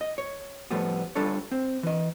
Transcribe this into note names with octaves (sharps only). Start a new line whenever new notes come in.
D#5
C#5
A2 F3 G3 A3 B3
G3 D4 F4 A4 C#5
C4
E3 D#5